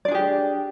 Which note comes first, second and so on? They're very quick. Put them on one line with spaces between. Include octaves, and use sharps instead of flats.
D5 D4 G#4 G4